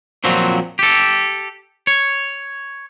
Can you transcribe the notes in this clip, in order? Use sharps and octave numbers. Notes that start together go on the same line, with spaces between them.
A#2 F3 F#3 C4
G4 A4
C#5